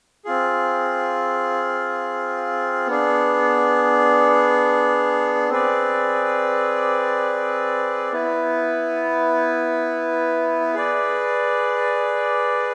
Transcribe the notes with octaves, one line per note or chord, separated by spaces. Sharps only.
C4 F4 G#4
B3 D4 G#4
C4 G#4 B4 D5
B3 E4 B4
G#4 B4 D5